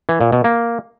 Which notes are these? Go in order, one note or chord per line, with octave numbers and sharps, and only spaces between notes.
E3
A#2
B2
A#3